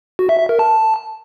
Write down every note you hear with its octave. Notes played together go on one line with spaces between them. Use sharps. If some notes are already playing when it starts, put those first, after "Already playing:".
F#4
E5
E5
A#4
A5